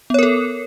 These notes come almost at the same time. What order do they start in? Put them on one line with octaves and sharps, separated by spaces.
B3 C#5 A#4 A4